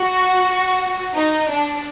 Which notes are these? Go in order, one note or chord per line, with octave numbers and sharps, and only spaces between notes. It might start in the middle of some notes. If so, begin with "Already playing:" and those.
Already playing: F#4
D#4
D4